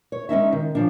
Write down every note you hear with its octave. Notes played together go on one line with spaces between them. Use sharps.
C#5
G#3 C#4 D#4 E5
D#3
C#3 F3 D4